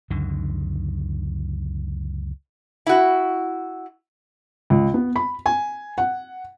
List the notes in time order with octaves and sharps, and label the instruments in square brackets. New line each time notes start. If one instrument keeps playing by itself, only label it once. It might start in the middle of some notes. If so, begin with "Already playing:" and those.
[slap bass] C#2 F#2 D3 D#3
[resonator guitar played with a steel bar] E4 F#4
[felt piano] C#2
B3
B5
G#5
F#5